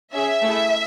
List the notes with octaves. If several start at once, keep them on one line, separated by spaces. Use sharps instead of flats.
C#4 G#4 E5
A3 E4 G#4